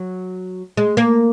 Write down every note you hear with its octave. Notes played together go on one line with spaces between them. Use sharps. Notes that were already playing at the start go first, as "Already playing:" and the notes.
Already playing: F#3
G#3
A#3